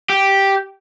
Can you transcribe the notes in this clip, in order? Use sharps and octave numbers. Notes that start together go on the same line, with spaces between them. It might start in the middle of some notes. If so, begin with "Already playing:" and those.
G4